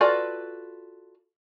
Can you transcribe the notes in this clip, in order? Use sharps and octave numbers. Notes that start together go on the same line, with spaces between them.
F4 F#4 A4 B4 D5